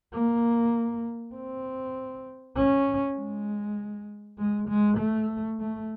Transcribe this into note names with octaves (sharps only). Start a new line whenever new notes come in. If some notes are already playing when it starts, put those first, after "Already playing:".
A#3
C4
C#4
G#3
G#3
G#3
A3
A3